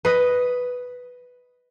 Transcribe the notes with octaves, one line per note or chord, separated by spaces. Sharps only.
B4 D#5